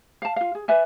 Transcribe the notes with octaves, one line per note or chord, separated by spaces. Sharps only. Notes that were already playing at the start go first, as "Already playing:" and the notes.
F5 A5
F4 F5
G#4
B4 D5 E5 G#5